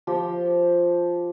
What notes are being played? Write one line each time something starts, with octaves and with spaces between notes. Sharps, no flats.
F3 G4